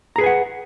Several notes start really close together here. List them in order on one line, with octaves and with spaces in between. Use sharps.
A#5 G#4 B4 G#5 F#5